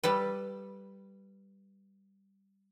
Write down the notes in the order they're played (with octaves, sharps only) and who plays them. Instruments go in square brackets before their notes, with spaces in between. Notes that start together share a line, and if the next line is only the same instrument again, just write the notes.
[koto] G3 A4 B4